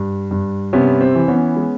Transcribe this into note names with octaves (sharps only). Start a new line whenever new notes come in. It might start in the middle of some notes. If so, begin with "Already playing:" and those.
Already playing: G2
G2
C3 B3 C#4
C4
E3
B3 C#4
G#3